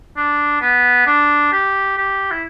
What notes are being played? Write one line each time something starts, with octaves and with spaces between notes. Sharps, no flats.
D4
B3
D4
G4
G4
E4